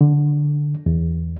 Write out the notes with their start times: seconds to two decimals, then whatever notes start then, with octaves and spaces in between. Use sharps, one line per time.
0.01 D3
0.86 E2